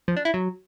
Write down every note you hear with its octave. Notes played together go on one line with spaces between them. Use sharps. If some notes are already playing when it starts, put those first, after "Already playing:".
F3
D4
E4
F#3